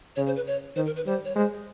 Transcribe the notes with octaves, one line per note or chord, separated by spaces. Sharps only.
C#3 C#5
C5
B4
C#5
D#3 C5
A#4
B4
G3 C5
C#5
G#3 C5